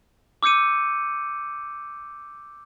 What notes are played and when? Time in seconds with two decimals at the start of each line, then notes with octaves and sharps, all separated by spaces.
0.43 D6 E6 G6 C#7 D#7